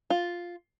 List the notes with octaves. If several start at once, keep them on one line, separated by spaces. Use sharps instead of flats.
F4